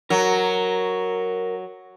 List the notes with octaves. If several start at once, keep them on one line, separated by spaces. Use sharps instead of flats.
F#3 A#4